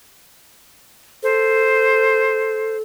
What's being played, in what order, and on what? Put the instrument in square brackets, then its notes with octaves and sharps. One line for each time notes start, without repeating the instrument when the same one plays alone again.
[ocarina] A4 [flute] C5